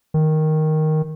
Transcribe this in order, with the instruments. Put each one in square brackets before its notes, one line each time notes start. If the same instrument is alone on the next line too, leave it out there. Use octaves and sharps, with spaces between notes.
[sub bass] D#3